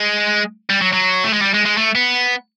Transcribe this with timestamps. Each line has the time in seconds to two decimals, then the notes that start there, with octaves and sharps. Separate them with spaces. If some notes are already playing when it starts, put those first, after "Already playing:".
Already playing: G#3
0.70 G3
0.81 F#3
0.93 F#3
1.24 A3
1.33 G#3
1.41 G3
1.54 G#3
1.65 G#3
1.77 A3
1.95 B3